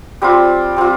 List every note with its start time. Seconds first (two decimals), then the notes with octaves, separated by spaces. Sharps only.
0.22 G3 C4 F4
0.77 G3 C4 F4